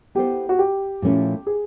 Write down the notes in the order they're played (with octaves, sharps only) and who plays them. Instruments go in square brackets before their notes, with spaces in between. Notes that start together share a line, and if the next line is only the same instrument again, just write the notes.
[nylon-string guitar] B3 E4 A4 C5 [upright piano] G4
[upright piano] F#4
G4
[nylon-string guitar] A#2 F3 A3 C#4 E4
[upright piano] G#4